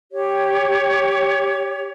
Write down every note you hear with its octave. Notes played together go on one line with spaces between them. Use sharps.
G4 C#5